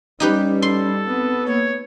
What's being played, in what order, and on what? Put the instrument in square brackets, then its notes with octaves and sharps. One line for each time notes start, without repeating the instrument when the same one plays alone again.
[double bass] G3 [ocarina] C#4 [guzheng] D#4 G4 B4
[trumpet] A4 [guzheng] C6
[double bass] B3 [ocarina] C4
[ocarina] A#3 [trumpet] C#5